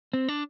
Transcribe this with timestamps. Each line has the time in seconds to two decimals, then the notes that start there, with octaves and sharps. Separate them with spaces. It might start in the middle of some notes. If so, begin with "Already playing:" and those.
0.13 C4
0.28 D4